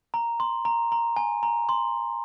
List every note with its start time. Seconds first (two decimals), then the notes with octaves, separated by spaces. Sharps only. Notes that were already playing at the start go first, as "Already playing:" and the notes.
0.14 A#5
0.40 C6
0.65 A#5
0.92 A#5
1.16 G#5
1.43 A#5
1.69 C6